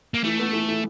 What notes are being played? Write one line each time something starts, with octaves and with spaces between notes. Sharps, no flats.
A#3
E3 A3
B3
E3
E3